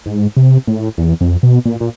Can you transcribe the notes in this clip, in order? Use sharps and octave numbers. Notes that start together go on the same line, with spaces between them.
G#2
C3
A2
E2
F2
B2
A#2
A#2